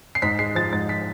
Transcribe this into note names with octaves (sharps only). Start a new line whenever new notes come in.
C7
G#2 B6
G#3 C7
F3 A6
G#2 A6
B6